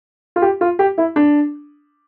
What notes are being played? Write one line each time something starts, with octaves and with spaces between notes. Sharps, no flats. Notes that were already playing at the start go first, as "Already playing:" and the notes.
F4
G4
F4
G4
E4
D4